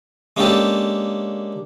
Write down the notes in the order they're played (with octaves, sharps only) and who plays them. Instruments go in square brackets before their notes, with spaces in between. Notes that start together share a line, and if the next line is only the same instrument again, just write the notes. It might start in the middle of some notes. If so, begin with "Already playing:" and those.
[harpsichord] G#3 A#3 C#4 D4 G4 A4